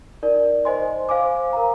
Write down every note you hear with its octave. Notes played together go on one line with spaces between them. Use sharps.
D#4 A#4 D5
C5 D#5 G#5 C6
C5 F5 G#5 D6
A#4 F5 A#5